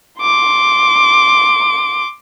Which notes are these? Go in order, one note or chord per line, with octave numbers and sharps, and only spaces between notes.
C6 D6